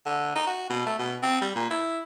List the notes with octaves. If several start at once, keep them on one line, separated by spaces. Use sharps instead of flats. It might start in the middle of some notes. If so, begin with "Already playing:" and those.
D3
D#4
F#4
B2
A3
B2
C4
G3
A#2
E4